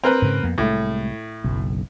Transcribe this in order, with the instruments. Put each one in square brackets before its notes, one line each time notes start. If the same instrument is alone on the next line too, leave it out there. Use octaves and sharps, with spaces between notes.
[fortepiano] C4 A#4 B4
[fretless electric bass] G#2 C#3
F2 A#3 B3
[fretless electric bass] C2 G#3 A3 [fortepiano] A2
[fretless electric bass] F#1 B1